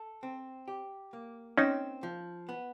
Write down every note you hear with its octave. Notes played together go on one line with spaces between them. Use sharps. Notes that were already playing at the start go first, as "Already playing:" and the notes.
Already playing: A4
C4
G4
A#3
C4 C#4 D#4
F3
B3